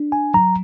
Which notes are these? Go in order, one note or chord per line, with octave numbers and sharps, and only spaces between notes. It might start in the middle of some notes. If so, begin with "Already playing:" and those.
Already playing: D4
G#5
F#3 A#5